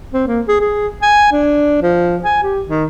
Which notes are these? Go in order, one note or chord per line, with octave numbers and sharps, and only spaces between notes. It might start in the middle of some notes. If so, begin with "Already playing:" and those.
C4
A#3
G#4
G#4
G#5
D4
F3
G#5
G4
D#3